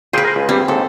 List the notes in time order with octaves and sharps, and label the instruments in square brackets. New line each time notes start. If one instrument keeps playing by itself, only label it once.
[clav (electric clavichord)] A#2 C5 G5 [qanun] G#4 B4
[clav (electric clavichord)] A#4 C5
C#2
[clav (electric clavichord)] G2 G3 [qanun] C4
[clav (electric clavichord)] D#2 G#2 [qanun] A4